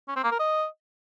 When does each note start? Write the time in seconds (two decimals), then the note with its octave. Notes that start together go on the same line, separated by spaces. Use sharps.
0.08 C#4
0.16 C4
0.24 A#3
0.31 A#4
0.39 D#5